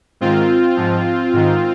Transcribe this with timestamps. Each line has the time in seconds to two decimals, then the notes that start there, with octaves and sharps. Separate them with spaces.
0.21 G#2 D#3 C4 F4
0.76 G#2 F3
1.33 G#2 D#3